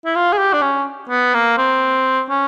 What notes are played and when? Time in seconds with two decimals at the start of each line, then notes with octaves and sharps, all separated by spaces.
0.05 E4
0.15 F4
0.32 G#4
0.38 G4
0.53 D4
0.62 C#4
1.09 B3
1.34 A#3
1.57 C4
2.29 C#4